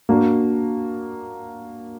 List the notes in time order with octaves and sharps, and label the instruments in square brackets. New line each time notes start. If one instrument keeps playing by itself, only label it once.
[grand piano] A#3 D4 F#4